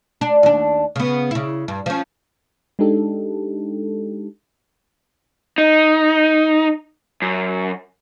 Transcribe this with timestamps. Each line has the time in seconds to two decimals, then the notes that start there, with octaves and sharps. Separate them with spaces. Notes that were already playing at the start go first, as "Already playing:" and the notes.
0.21 D4
0.43 D#2 D4
0.96 C#3 B3
1.31 C#3 E4
1.68 G2
1.86 F3 C#4
2.79 G#3 D4 D#4 G4 A4
5.58 D#4
7.22 F#2